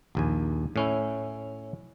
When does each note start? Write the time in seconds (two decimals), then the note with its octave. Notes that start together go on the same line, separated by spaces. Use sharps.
0.15 A#1 D#2 G#5
0.76 A2 C#4 E4